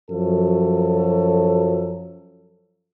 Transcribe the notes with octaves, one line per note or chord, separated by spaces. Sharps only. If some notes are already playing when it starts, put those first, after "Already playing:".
F#2 F3 F#3 A4